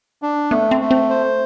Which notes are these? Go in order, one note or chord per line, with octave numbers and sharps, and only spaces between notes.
D4
A3 B3
C4
A3
C4
C5